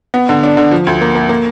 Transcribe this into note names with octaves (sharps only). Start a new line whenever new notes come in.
B3
D3
D4
D3
F3
D2
A#3
A#3
A#3